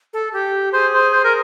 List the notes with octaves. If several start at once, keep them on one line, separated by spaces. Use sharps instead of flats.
A4
G4
G#4 C5
C5
C5
A#4